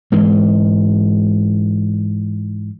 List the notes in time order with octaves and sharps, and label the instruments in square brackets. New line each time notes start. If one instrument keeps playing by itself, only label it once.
[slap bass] G#2 E3 G#3